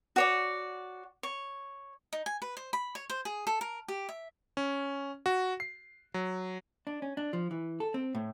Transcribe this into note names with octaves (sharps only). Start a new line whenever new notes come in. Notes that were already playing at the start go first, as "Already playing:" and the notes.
F#4 C#5 D5
C#5
D#4
G#5
B4
C5
B5
C#5
C5
G#4
A4
A#4
G4
E5
C#4
F#4
C7
F#3
D4
C#4
D4
F3
E3
A4
C4
A2